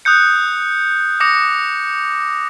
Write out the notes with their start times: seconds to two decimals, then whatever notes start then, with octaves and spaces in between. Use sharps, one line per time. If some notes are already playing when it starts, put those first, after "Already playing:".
0.05 D#6 F#6 G6 C#7
1.20 D6 D#6 A#6 C#7